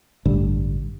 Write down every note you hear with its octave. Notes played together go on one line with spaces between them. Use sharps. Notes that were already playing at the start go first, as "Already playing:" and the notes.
A1 G2 D3